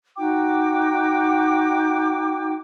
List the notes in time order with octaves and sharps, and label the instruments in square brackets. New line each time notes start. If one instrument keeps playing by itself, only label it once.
[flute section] D#4 F#4 G5 D6